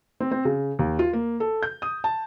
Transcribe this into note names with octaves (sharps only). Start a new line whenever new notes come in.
C4
C4
C#3
D#2
F4
A#3
A4
G6
D#6
A5